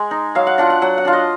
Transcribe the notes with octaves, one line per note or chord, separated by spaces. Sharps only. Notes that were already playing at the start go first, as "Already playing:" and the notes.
Already playing: G#3
D#4
F#3 F5
F#5
D4 F4 F#5
F#5
F#3 F#5
F#5
D4 F4
D#5